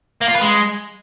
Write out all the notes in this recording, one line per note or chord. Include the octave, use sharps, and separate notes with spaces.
A#3
F4
B4
G#3